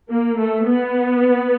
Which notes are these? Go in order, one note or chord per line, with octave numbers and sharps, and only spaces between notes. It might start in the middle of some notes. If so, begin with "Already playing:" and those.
A#3
A3
B3